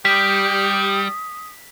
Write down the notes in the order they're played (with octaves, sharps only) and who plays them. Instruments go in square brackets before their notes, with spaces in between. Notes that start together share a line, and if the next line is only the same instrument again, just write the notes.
[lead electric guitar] G3 [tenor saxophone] G4 [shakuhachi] D#6 [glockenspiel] B6